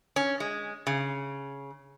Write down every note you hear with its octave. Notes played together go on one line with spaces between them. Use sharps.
C#4
G#3
C#3